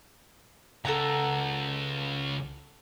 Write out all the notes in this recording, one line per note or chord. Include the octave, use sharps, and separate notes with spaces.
C#2 A4 F#5 A#5